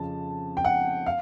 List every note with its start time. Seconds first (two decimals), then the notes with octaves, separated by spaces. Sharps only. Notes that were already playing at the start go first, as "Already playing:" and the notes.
Already playing: F2 C#3 F3 A5
0.57 G5
0.64 F#5
1.06 F5